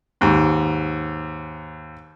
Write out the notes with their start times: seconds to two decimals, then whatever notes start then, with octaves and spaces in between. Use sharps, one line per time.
0.21 D#2 G#2